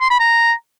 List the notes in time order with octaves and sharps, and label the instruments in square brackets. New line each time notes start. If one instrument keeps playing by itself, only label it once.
[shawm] C6
B5
A#5